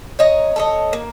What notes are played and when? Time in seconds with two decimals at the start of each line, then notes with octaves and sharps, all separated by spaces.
0.19 C#5 D#5 A#5
0.56 A4 C#5 D#5
0.93 A#3